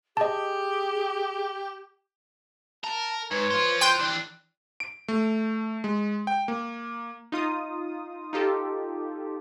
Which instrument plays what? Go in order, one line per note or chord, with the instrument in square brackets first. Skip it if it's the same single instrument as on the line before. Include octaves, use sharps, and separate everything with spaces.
[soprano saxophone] G4 [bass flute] G#4 [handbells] D#5 A5
[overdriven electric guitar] A#4 [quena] A5
[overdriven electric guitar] G#2 [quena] B4 [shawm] C#5
[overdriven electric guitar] F4 C5
[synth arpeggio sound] G5 C6 G6 [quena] F#6
[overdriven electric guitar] E3 D4
[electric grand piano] D7
A3
G#3
G5
A#3
[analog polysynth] D#4 F4 D#6
D#4 F4 G4 A4